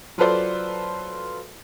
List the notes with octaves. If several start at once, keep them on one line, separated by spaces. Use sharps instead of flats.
F#3 F4 A4 B4 C5 D5